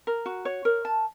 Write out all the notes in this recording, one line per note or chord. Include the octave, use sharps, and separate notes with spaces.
A#4
F#4
C#5
A#4
A5